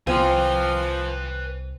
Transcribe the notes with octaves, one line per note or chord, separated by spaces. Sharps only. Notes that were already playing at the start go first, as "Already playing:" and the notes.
C2 F3 C4 B4 G#5